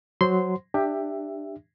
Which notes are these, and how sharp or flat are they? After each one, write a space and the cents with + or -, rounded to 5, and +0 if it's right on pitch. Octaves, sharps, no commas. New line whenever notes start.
F#3 +0 C5 +0 C6 -15
D4 +20 G4 +10 E5 +10